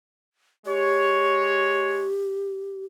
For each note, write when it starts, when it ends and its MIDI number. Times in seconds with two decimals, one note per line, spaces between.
0.66 2.10 56
0.66 2.85 67
0.66 2.10 73